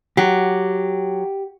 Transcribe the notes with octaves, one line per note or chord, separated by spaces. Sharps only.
F#3 G4